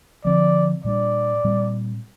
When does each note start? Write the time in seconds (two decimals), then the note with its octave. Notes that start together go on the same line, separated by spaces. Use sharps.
0.24 D3 F3 C4 D5
0.84 A#2 G3 D4 D5
1.44 A#2 G3 C4